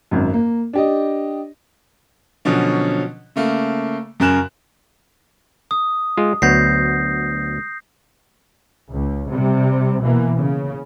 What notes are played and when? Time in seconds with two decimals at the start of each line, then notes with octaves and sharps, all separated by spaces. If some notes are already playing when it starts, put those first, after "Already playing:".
0.11 G#1 F#2
0.33 A#3
0.73 D4 G4 D#5
2.45 B2 D3 F3 F#3 C#4
3.36 C#3 A3 A#3
4.20 F#2 C#3 A#4 G#5 F#6 E7
5.71 D#6
6.17 G#3 F4
6.42 D2 F#3 B3 G6 A#6 C7
8.89 C#2
9.30 C3 G3
10.01 B2 E3 A#3
10.35 C#3